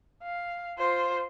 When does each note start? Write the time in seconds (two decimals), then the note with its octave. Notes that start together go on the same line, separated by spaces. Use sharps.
0.23 F5
0.78 F4 C5